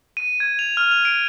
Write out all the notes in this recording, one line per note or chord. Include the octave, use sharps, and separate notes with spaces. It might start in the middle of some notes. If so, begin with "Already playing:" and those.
D#7
G#6
F7
F6
F7
D7